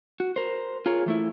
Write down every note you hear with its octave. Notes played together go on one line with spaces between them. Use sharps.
F#4
A#4 C5
F4 G#4 A#4 C#5
E3 A3 E4